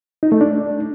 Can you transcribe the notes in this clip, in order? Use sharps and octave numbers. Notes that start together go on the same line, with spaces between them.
D#4
A3
D4